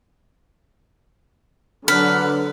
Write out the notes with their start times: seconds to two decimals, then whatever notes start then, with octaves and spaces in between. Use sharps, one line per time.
1.88 D3 F#3 B4 F6